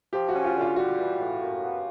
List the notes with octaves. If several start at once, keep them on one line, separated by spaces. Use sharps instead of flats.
F3 G4
F#4
C#4
F4
D3
F4
G3 F#4
E3
A2
F#2
B3